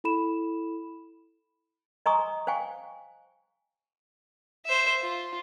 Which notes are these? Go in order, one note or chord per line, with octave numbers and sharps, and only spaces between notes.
E4 A4 B5 E7
D#5 G#5 A#5 C6 C#6 D#6
C5 F5 G5 G#5 C#6
C5 E5
F4